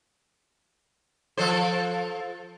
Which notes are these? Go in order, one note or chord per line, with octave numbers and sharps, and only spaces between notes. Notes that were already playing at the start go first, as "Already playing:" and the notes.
F3 A4 C5